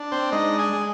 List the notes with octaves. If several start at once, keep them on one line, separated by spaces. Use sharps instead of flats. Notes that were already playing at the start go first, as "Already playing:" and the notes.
Already playing: D4
C4 C5
G#3 D#4 D#5
G#4 G#5
G#3